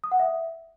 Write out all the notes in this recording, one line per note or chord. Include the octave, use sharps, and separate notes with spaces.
D#6
F#5
E5